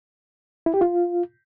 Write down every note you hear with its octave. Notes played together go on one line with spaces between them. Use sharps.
E4
G4
F4